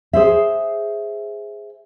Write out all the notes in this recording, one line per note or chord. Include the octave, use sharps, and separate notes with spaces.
G#4 C5 E5